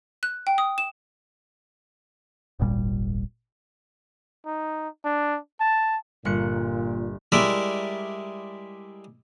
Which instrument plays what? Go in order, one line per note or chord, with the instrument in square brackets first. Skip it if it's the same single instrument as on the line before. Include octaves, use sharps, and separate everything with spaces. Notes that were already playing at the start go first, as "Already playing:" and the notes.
[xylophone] F#6
G5
D#6
E7
[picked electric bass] D#1 G#1 A#2 G3
[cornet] D#4
D4
A5
[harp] G1 F#6 C#7 [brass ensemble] A#2
[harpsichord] G3 G#3 E4 A#4 D5 E5